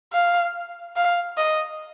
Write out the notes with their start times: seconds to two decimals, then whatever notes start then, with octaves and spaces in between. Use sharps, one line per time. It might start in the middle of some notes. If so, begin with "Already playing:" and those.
0.13 F5
0.96 F5
1.37 D#5